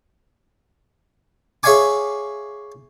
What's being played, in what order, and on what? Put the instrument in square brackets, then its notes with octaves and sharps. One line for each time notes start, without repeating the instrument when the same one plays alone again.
[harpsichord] G#4 C#5 E5 F5 G#5 D6